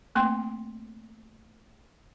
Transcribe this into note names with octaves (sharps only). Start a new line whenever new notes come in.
A3 A#3 C4 G5 C6